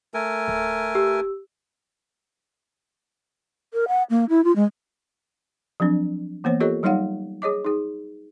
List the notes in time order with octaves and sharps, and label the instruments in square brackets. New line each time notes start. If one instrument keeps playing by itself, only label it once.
[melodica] A3 A#4 G#5
[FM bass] D1
[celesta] G4 E6
[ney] A#4
F#5
A#3
E4
F4
G#3
[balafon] F3 F#3 C4 D4
E3 A#3 B3 C5 C#5
F4 G4 A4 A#4 C#5 D#5
F#3 G3 D#4 C#5 F5 F#5
G#4 C#5 D#5 D6
D#4 G#4